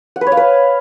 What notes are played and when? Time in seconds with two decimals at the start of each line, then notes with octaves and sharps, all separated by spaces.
0.16 F#5
0.21 B4
0.27 C#5
0.32 F5
0.37 B4